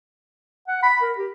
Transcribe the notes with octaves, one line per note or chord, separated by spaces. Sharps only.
F#5
B5
A#4
G4